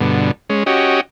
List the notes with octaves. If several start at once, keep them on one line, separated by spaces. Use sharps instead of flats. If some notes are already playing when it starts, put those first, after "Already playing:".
G2 B2 D3
G#3 C#4
C#4 F#4 G4 D#5